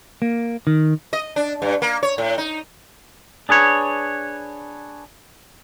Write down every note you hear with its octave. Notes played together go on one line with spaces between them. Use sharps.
A#3
D#3
D#5
D4
G2
A#3
C#5
A2
D#4
D4 G#4 B4 C#5